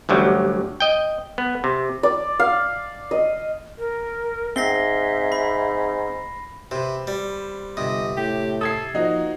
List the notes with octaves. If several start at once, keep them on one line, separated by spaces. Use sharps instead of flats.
A1 D2 F#3 G3
D#5 G5
B3
C3
D5
F5
D#5
A#4
G#2 C4 E5 A#6 C7 G7
B5
C3 B4 C5
G3
G1 C3 D#5
A2 G4
A4 D#6 G#6 C7
F3 A#3 D#4 F#4